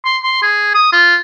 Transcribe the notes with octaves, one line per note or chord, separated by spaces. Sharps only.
C6
C6
G#4
D#6
F4